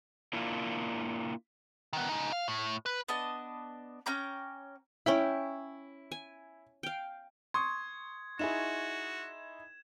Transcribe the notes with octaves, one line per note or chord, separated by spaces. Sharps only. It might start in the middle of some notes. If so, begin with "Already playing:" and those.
A#3 D4 E4 F4
D#3 B3
C#3 D#4
F5
A2
B4
B3 D4 D#5 A5
C#4 G5 A#5 D6
C#4 E4 G5 B5
G#5
F5 G5
C6 C#6 D#6 G#6
D#4 E4 F#4 G#4 E7